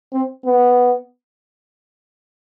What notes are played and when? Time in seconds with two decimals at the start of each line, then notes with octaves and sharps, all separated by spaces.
0.13 C4
0.45 B3